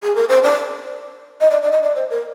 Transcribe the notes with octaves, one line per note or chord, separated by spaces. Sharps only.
G#4
A#4
C5
D5
D#5
D5
D5
D#5
D5
C5
A#4